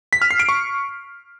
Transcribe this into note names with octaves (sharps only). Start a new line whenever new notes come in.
B6
F6
C7
D7
C#6